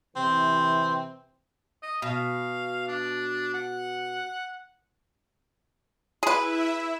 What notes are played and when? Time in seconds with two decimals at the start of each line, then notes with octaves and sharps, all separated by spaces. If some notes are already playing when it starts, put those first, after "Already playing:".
0.16 C3 E3 C4
1.82 D#5
2.02 B2 F5
2.88 D4
3.54 F#5
6.23 E4 G#4 B4 E5